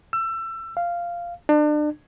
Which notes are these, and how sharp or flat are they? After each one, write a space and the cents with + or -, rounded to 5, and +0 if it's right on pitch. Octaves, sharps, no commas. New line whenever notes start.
E6 +25
F5 -10
D4 +35